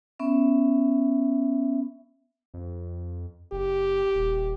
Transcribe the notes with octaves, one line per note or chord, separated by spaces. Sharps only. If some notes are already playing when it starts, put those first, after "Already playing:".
B3 C#4 E5
F2
F#1 G4
D#1